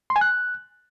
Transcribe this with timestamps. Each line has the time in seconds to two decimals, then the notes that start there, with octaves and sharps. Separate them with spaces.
0.10 C6
0.16 G#5
0.21 F#6